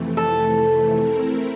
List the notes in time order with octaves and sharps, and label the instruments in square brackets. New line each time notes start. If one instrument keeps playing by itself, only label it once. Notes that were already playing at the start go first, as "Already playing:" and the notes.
Already playing: [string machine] F2 C3 E3 A3
[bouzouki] A4
[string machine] A3 C4 E4 A#4